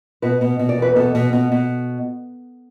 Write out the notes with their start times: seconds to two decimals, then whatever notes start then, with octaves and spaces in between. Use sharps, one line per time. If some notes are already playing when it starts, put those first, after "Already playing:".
0.22 B2 B4
0.41 B2
0.59 B2
0.69 D5
0.78 E2 B4
0.96 B2 A4
1.15 B2
1.33 B2
1.52 B2